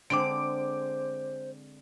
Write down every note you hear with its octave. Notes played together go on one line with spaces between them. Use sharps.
D3 G#3 C4 C5 D6 D7